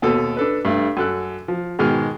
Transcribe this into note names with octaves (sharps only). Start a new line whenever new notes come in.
D#2 B2 A4
D4 A4 B4
G2 A3
F#2 A4 F#6
F3
G#2 B2 D#3 G#3 F6